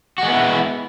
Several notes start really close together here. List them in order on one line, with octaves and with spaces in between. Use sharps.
F#4 G#3 B3 E4